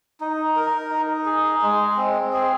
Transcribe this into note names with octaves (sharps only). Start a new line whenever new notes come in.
D#4
A#4
D#4
G#4
G#3
C4
G#4